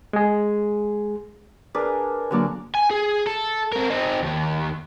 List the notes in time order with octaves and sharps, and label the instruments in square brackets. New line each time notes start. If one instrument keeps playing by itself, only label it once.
[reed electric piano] G#3 G#4
[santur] D4 G#4 A#4 [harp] B4
[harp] D3 F#3 A#3 [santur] D5 G#5
[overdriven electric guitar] G#5
G#4
A4
C4 A#4
C4 D#4
D#2 D#3